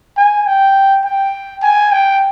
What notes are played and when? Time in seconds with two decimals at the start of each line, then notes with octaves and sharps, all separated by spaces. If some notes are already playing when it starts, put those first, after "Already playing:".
0.17 G#5
0.46 G5
1.05 G5
1.62 G#5
1.92 G5